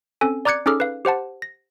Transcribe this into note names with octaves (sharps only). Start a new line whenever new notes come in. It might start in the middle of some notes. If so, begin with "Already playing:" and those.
C4 C#4 A4 G#5
D5 A#5 D6 F#6 G#6 C#7
C#4 D#4 G#4 A4 D6 F6
B4 F5
G4 C5 F#5 A5
A#6